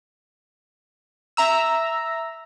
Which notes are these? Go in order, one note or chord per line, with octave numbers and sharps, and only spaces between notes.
E5 A#5 E6